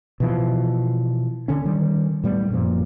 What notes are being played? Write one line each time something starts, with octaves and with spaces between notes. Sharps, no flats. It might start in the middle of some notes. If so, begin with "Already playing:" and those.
B2 E3 F3
D3 C#4
D#3 G3
A2 G3 B3
F#2 A#2 F3